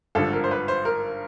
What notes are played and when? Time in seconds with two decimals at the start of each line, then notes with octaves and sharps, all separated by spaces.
0.15 G#1 G2 D3 F3 A4
0.33 A#4
0.44 C5
0.51 B4
0.68 C5
0.85 A#4